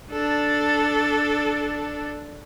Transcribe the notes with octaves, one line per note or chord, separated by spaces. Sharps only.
D4 A4